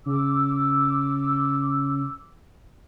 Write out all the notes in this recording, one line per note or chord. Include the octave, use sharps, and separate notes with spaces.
C#3 D6 E6